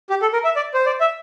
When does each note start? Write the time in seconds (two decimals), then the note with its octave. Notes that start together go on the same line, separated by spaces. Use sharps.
0.10 G4
0.22 A4
0.33 A#4
0.44 E5
0.56 D5
0.74 C5
0.86 D5
1.00 E5